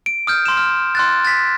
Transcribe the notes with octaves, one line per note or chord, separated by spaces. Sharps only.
D7
D#6 F6 G6
C6 E7
F6
C6 F#6 A6
A6 B6